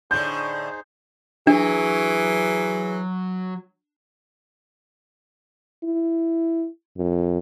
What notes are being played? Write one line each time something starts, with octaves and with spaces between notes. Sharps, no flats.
A2 D3 D#4 G#4 C5 G6
E3 F#3 D4 G#4
E4
F2